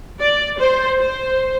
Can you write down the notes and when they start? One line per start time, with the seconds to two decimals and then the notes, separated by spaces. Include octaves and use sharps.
0.21 D5
0.59 C5
0.99 C5